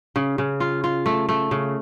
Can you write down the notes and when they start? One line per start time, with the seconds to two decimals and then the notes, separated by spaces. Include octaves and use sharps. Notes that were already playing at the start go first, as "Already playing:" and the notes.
0.16 C#3
0.38 C#3
0.60 F4
0.84 F4
1.06 A3
1.29 A3
1.51 C#3